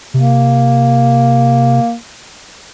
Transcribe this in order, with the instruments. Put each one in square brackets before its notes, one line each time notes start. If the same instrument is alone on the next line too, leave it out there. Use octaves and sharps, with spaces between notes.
[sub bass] C3 [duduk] A#3